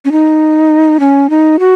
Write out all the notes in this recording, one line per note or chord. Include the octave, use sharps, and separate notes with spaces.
C#4
D#4
C#4
D#4
F#4